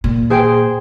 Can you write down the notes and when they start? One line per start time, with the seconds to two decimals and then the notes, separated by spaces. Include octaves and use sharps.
0.04 A#2
0.30 G#4 C5 G5